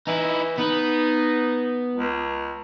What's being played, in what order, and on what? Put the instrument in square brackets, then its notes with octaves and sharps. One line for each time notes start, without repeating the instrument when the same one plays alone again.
[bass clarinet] E3 [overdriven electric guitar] D#4 E4
[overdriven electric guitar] B3 B4 [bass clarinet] D#4
[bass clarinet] C#2